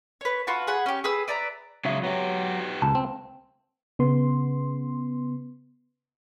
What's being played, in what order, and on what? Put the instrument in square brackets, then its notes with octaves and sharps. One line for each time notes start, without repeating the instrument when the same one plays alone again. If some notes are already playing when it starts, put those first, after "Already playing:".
[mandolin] B4 C#5
F4 F#4 B4 A5
G#4 F#5 B5
C#4 G4
G#4 B4 D#6 E6
B4 D5 E5 A#5
[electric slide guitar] C#3 E5 F5 [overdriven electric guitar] F#3 G#3
[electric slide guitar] F#3 [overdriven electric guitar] B3 G4
[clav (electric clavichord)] C#2 [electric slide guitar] A5
[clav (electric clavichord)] C4
[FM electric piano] C#3 B3 C6